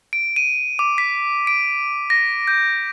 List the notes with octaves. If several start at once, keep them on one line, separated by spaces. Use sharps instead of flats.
D7
D#7
D6
B6
D7
A#6
G6